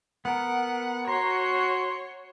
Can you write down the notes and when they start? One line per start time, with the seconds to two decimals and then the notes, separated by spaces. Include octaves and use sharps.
0.25 B3 A#4 F#5
1.08 F#4 C#5 A#5 C6